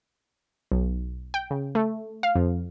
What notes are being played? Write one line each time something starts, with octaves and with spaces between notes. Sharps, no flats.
B1
G5
C#3
A3
F5
F2